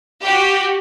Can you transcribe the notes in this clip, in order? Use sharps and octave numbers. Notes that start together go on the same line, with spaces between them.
F#4 G4